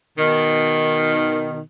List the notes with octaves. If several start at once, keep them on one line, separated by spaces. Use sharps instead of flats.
B2 D#3